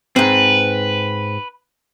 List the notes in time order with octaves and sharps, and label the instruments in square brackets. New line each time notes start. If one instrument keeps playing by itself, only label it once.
[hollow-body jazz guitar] G#2 C4 [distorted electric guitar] B4